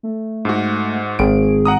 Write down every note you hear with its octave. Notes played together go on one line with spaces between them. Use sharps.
A3
G#2 F#4
G#1 G#4 D7
F#5 A#5 D#6